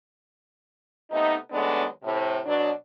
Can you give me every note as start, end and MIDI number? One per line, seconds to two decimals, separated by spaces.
1.11 1.36 48
1.11 1.36 57
1.11 1.36 59
1.11 1.36 63
1.51 1.85 39
1.51 1.85 54
1.51 1.85 56
1.51 1.85 57
1.51 1.85 59
1.51 1.85 62
2.03 2.39 45
2.03 2.39 48
2.45 2.70 47
2.45 2.70 54
2.45 2.70 62